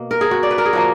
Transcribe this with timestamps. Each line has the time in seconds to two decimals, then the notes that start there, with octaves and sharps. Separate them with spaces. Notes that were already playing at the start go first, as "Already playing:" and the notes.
Already playing: B2 A#3
0.11 A#4
0.21 G#4
0.31 F#4
0.43 D5
0.51 B4
0.58 A#4
0.65 G#4
0.73 F3 A#3 F#4